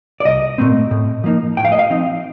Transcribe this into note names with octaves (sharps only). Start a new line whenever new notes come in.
D5
C2 D#5
A#2 A3 C4
A2
F3 A#3 D#4
A2 G5
F5
D#5
F5
F3 C4 D#4